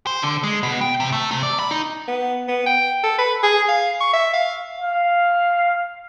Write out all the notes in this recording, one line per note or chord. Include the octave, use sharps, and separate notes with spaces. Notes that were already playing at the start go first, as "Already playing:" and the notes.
C5
D3
G#3
B2
G5
C3
A3
C3
D5
B5
D#4
B3
B3
G5
A4
B4
G#4
F5
C#6
E5
F5
F5